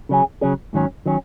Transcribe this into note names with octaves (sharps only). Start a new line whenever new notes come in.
C#3 F#3 C#4 G#4
C#3 F#3 C#4 G#4
G#2 D#3 F#3 C#4
D#3 F#3 C#4